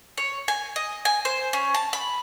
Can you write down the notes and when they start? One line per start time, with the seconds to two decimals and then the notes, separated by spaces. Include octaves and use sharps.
0.18 C#5
0.48 G#5
0.76 D#5
1.05 G#5
1.25 C5
1.53 C#4
1.74 A5
1.93 B5